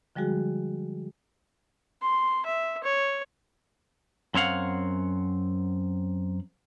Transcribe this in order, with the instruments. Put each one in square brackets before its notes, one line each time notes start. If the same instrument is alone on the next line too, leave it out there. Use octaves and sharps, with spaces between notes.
[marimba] D3 F3 G3 G#3 F#4 G#4
[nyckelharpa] C6
E5
C#5
[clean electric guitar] F#2 C4 C#5 F5 F#5